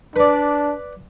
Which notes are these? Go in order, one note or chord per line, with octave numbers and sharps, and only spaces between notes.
D4 B4 D5